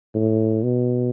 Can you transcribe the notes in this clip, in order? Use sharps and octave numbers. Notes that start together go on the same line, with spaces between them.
A2
B2